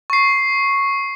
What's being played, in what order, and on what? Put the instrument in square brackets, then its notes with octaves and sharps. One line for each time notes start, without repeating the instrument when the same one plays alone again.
[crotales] C#6 C7